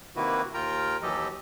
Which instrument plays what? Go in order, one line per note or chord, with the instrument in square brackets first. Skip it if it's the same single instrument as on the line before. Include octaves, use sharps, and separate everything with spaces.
[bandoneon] C3 D#3 A#3 E4 F#4 B4
D#2 F4 A#4 G5 A#5
D#2 E3 F#3 G4 A4 D#5